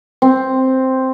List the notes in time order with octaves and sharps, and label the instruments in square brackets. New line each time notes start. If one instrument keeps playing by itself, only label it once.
[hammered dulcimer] C4